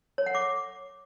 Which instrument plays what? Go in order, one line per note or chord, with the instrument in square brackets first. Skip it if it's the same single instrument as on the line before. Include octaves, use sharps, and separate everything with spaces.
[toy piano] C#5
F#5
D6